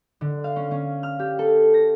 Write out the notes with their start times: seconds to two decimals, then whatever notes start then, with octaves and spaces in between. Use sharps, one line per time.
0.21 D3
0.44 F5
0.56 C#4
0.71 C#4
1.03 F6
1.19 G4
1.39 A4
1.74 A#6